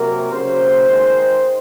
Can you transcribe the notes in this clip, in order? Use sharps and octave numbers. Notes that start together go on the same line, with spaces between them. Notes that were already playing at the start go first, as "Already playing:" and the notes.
Already playing: C3 F#3 A#3 A#4
C#3 F#3 A#3 C5
D#3 G#3